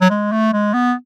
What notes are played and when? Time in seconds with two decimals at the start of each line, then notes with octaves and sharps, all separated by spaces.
0.01 F#3
0.10 G#3
0.32 A3
0.53 G#3
0.74 B3